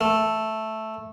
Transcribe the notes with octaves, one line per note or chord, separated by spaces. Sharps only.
A3